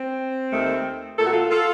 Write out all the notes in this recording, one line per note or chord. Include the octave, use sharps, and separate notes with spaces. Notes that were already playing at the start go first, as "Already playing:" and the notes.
Already playing: C4
D#2 D#3 A3
A#2 A3 F#4 A4
F4 A4
F4 A4